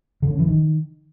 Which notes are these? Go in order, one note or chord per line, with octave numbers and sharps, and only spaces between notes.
D3
C#4
E3
D#3